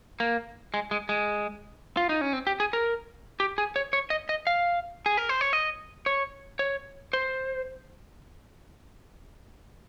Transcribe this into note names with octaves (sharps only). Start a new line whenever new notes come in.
A#3
G#3
G#3
G#3
F4
D#4
C#4
C4
G4
G#4
A#4
G4
G#4
C#5
C#5
D#5
D#5
F5
G#4
A#4
C5
C#5
D#5
C#5
C#5
C5